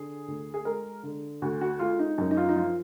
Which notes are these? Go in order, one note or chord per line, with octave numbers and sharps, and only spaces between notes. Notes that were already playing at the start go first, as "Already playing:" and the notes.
Already playing: D3 G#4
D2
G#4
G#3 A#4
D3
D2 F#4
F#4
G#3 F4
D#4
F#2 D#4
D#4
F4
D#4
F3 F4